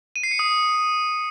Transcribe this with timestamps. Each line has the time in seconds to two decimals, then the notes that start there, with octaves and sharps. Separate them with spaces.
0.16 D#7
0.23 C7
0.31 C#7
0.39 D#6